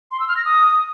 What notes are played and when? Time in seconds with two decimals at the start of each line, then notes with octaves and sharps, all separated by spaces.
0.11 C6
0.20 E6
0.28 F6
0.37 A#6
0.45 D#6